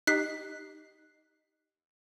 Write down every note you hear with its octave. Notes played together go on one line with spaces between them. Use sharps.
D#4 G4 D#5 F#6 B6 C7